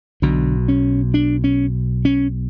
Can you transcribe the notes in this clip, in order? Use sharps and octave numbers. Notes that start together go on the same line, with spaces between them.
B1 B2 D3
C#4
D4
C#4
C#4